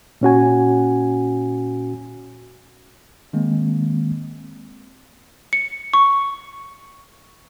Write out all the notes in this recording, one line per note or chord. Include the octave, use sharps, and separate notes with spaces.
A#2 C#4 F#4 G#5
D#3 G#3 A#3 C4
C#7
C#6